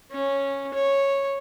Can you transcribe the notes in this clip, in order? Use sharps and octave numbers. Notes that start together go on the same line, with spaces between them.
C#4
C#5